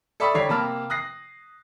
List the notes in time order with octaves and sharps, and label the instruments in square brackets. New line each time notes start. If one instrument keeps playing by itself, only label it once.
[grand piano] A4 D5 E5 B5 C#6 D#6
D3 G3 C#5 C7
C3 A#3 A5 B5 F6
D#6 F#6 A#6 C7